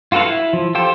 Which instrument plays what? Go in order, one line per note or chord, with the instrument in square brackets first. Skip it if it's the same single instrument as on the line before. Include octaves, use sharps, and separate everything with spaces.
[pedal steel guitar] F4 F#4 A4 B4 F5
E4
F3
F4 G4 A4 C5